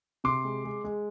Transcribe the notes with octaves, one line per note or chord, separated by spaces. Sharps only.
C3 C6 D6
G#3
G#3
G#3